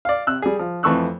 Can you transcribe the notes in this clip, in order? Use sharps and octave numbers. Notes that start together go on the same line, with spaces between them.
D5 F5
C3 E6 F#6
G3 G#4
F3
F2 E3 A3 C#6 E6 F#6